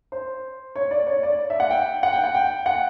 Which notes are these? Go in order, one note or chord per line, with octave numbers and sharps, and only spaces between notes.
C5
C#5
D5
C#5
D5
E5
F#5
G5
F#5
G5
F#5
G5
F#5